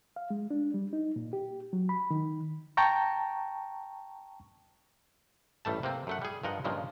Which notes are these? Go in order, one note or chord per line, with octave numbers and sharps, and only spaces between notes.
F5
G#3
D4
G3
D#4
A#2
G4
F#3
B5
D#3
G5 A5 A#5 C#6
A1 G3 A3 A5
C3 A#3 C4
F#2 A3 F#5
G3 G#4
G2 F3 A#4 D#5 F#5
G2 A#2 C#3 F3 G#3